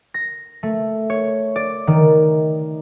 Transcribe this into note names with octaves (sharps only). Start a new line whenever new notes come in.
A#6
A3
C#5
D5
D#3